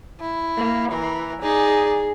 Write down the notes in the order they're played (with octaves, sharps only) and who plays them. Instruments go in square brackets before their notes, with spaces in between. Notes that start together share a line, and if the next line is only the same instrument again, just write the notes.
[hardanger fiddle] E4
[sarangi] A#3
[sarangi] E3 [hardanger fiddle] A#4
[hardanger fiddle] D#4 D5 [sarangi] G#4